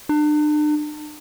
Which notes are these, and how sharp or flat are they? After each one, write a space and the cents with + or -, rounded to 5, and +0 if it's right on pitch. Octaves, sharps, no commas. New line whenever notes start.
D4 +40